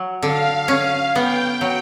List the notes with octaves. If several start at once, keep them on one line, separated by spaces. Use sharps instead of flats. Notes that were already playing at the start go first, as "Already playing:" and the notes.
Already playing: F#3
D3 F5
C#4
B3 G5
F#3